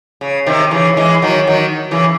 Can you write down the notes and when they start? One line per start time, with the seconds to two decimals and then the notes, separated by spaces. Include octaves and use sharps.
0.21 C#3
0.46 C3 D#3
0.71 C#3 E3
0.97 E3 G#3
1.22 D#3 F#3
1.47 D#3 F#3
1.91 C#3 E3